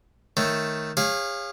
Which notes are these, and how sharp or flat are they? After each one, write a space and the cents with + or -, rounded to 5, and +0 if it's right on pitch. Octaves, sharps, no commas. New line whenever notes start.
D#3 +0 A3 +0 C#5 +0
G#4 -40 C#5 -15 F5 +0